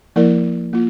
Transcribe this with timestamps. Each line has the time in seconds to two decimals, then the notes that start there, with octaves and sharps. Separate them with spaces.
0.16 F3 A#3 E4 A#4 D5
0.73 A#3 F4